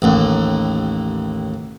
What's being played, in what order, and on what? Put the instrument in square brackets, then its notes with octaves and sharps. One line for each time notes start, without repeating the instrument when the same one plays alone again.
[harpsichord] A1 D#2